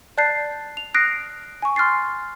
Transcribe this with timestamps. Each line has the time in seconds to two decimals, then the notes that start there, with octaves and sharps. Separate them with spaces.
0.18 D5 A5 F#6 G6 A6 C7
0.77 F7
0.94 D#6 F6 F#6 A#6 C7 D7
1.62 G#5 C#6
1.76 C6 F6 F#6 A6 C7